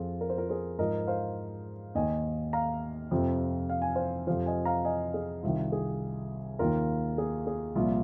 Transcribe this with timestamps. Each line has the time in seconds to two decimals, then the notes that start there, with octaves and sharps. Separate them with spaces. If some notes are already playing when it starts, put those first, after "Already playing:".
Already playing: F2 F3 F4 G#4
0.21 A#4
0.30 C5
0.38 F4 A#4
0.49 G#4 C5
0.78 G#2 F3 A#4 D#5
1.07 C5 F5
1.95 D#2 D#3 D#5 G#5
2.53 F5 A#5
3.11 F2 C3 F3
3.70 F5
3.82 G#5
3.96 C5 F5
4.27 F2 C3 F3 C5 F5
4.46 D#5 G#5
4.65 F5 A#5
4.85 D#5 G#5
5.14 G#4
5.43 C2 C3 D#3 F4
5.72 G#4
6.59 D#2 D#3 F4 A#4
7.18 G#4
7.47 G#4
7.75 C2 A#2 F3 F4